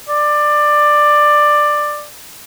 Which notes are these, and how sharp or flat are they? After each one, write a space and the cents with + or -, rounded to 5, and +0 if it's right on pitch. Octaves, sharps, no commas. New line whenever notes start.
D5 +15